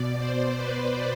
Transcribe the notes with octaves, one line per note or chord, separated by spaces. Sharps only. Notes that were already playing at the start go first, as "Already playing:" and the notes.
Already playing: B2 D5
C5
B4